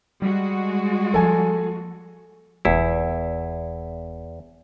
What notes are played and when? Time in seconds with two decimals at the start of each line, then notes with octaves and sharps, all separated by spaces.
0.22 G3 G#3 F#4
1.14 F3 A#3 A4 G#5
2.65 F1 E2 E4